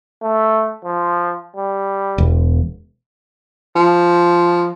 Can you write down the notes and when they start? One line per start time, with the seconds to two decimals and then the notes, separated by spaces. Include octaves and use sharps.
0.22 A3
0.85 F3
1.56 G3
2.18 E1
3.75 F3